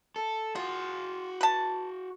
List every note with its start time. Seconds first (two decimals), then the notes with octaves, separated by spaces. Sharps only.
0.16 A4
0.55 F4 F#4 G#4
1.41 B4 A5